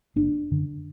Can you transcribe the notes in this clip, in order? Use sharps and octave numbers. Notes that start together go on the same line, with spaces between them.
F#1 D4
F#2 D3